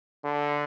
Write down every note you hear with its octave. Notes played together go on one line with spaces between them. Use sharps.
D3